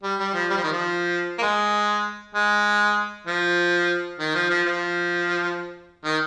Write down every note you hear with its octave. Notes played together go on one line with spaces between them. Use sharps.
G3
G3
F3
G3
F3
D#3
F3
A#3
G#3
G#3
F3
D#3
F3
F3
F3
D#3